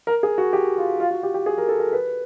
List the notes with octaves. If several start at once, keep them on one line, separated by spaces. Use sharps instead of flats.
A#4
G#4
F#4
G4
F4
F4
F#4
G4
G4
G#4
A#4
A4
A#4
B4